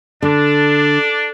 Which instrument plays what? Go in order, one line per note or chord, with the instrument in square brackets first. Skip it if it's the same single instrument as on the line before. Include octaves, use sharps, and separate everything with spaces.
[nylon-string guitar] D3 [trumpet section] D4